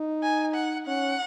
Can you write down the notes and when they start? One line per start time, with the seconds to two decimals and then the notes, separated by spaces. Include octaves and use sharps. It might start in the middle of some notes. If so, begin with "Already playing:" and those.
Already playing: D#4
0.23 G#5
0.55 F#5
0.87 C#4 F#5